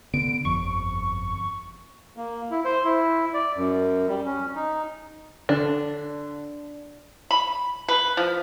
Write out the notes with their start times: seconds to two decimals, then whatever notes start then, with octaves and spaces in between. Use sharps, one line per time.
0.14 D3 B3 D7
0.45 G1 F2 C#6
2.17 A#3
2.51 E4
2.65 C5
2.84 E4
3.34 D5
3.56 F#2
4.08 G3
4.25 C#4
4.55 D#4
5.49 D3 D4
7.31 B5
7.88 B4
8.17 F3